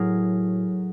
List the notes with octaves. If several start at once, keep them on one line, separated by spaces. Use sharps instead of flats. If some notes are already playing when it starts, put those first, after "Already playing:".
Already playing: A2 F#3 G#4 A#4